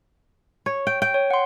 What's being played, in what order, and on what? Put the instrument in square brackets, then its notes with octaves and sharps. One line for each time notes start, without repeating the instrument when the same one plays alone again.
[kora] C#5
G5
G5
[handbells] C#5
F#5 C6